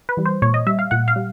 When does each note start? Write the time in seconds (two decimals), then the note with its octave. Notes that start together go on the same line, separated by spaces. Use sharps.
0.09 B4
0.17 E3 G3
0.26 C5
0.42 A#2 C#5
0.54 D#5
0.67 G3 E5
0.79 F5
0.91 A#2 F#5
1.08 F5
1.16 G3